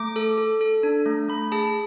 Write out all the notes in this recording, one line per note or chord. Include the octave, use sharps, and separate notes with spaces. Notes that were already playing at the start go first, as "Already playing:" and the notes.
Already playing: A3 D6
A4
A4
A4
D4
A3
A3 B5
G#4 A5